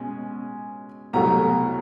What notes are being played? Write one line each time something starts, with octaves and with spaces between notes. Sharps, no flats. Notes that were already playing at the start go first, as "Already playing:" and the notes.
Already playing: B2 G#3 C#4
C2 B2 F#3 A3 A#5